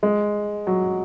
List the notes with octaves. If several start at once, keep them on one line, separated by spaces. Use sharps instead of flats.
G#3
F#3